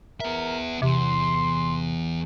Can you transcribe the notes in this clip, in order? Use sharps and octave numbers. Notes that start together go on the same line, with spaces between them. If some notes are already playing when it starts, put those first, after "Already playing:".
B3 A#4 E5
E2 C3 C6